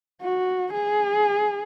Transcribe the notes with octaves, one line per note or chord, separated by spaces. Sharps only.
F#4
G#4